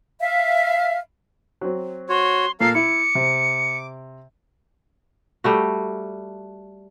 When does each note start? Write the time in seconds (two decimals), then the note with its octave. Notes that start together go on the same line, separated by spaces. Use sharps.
0.20 E5 F5
1.61 F#3 C4
2.09 F#4 C#5 C6
2.60 A#2 A4 A#4 F5 C7
2.75 E4 D6 C#7
3.15 C3
5.44 G3 A3 F#4